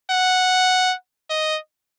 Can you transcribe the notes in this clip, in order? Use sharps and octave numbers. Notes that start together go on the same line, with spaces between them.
F#5
D#5